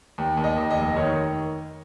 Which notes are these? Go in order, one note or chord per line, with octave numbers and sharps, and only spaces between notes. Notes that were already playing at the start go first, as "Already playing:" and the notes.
D#2
D#2
D#5
D#2
D#5
F1
D#3 C#5